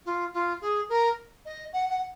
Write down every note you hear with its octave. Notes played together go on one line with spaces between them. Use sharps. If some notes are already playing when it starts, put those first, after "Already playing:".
F4
F4
G#4
A#4
D#5
F#5
F#5